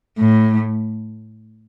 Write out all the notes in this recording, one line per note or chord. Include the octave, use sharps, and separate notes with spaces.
A2